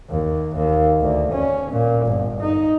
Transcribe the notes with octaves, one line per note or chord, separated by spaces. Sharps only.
D#2
D#2
D2
C#4
A#2
G1
D#4